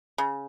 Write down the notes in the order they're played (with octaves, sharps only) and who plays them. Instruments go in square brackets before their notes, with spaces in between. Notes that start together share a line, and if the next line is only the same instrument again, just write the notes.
[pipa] C#3